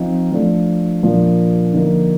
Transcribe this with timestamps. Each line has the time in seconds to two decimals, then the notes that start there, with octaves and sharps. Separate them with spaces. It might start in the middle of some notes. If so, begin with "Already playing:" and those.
Already playing: F3 C4 D#4
0.32 F3 A3 D4 A4
1.03 A#2 F3 A#3 D4 F4
1.74 D3 F3 A#3 D#4